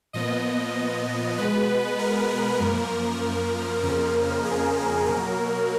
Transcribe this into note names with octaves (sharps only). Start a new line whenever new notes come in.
A#2 F3 B3 D#5
B2 G#3 B3 B4
A#4
F#2 F3 A#3
F2 C#3 F3 A#3 A#4
G#4
B2 F#3 A#3 A#4